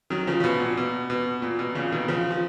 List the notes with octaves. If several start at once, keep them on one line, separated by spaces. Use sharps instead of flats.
D#3 F#3
C#3 F3
C#3
B2
A#2
B2
B2
A#2
B2
A#2 C#3
B2 D#3
C#3 F3
F3